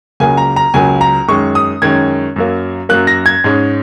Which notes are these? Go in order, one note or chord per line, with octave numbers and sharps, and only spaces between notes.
C#2 C#3 F#3 A#3 G#5
A#5
A#5
C#2 C#3 F#3 A#3 G#5
A#5
F#2 D#3 G#3 C#4 C#6
D#6
F#2 D#3 G#3 C#4 G#6
F#2 F#3 A#3
F#2 F#3 A#3 F#6
A#6
G#6
G#2 G#3 C#4